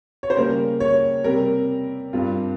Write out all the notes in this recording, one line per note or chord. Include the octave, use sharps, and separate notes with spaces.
C#5
C5
C#3 G3 A#3 A#4
C#5
C3 G3 C4 A#4
G2 G3 C4 F4